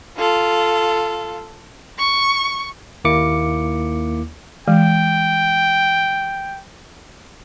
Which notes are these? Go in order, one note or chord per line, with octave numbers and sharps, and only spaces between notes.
F4 A4
C#6
D#2 A#3 E4 D6 C#7
E3 G#3 G5